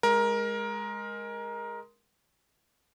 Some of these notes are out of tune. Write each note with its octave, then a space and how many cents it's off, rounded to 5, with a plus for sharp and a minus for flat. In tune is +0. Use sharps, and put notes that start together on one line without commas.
G#3 +0 A#4 +15